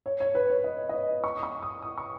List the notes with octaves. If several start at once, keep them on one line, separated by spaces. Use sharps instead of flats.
C#5
C#5
B4
C#5
D#5
D#5
C#5
C#6
D#6
C#6
D#6
D#6
C#6